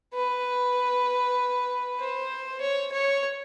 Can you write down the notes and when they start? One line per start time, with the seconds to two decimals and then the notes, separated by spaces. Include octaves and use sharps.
0.14 B4
2.00 C5
2.61 C#5
2.92 C#5